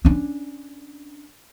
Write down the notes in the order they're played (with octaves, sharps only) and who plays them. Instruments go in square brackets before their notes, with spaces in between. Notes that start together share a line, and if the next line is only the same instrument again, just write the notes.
[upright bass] C#4 D4